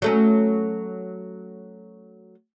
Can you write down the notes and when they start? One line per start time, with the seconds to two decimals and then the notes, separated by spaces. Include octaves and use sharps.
0.02 F#3 A3 C#4